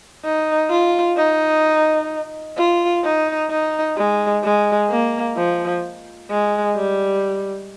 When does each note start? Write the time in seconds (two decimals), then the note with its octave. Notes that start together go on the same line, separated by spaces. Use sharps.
0.24 D#4
0.70 F4
1.17 D#4
2.57 F4
3.04 D#4
3.50 D#4
3.97 G#3
4.43 G#3
4.90 A#3
5.37 F3
6.30 G#3
6.76 G3